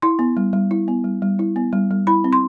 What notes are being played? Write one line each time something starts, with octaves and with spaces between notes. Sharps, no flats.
E4 C6
B3
G3
G3
E4
B3
G3
G3
E4
B3
G3
G3
E4 B5
C4
C6